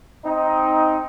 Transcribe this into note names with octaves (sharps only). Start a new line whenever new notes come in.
C4 D#4